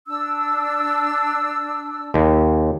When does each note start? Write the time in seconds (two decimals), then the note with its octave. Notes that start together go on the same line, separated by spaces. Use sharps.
0.08 D4 E6
2.14 D#2